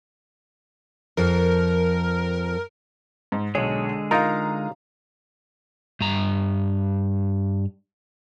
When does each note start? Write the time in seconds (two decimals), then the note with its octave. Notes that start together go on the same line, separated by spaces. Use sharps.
1.17 F2 F3 A#4
3.32 G#2
3.55 B1 D3 G#3 G#4 C#5
4.11 D#4 F4 A#4 F5 A#5
6.01 G2 A#5